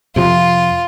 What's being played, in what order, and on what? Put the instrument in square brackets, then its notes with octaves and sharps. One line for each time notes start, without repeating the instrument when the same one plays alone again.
[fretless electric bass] F2 C3 F3 [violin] F4